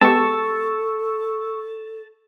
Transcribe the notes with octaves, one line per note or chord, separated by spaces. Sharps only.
G#3 B3 G4 A4 A5 C#6 E6